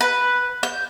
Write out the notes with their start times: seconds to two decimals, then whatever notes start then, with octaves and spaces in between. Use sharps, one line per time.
0.01 B4
0.63 G6